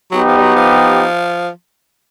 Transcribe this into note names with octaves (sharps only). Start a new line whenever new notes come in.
F#3 B3 D#4 G4
F3
G3
F#3
F3